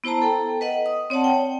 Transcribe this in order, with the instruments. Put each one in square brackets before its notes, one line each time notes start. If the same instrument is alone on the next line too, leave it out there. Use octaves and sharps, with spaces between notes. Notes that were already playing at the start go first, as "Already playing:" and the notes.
[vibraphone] B3 E4 C5 A5 A#5
A4 G5
B4 D#5 F#5
D#6
C4 C#5 D5 F#5 A5
G5